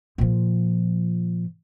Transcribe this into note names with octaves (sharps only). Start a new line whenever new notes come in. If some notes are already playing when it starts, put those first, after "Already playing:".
A#2 F3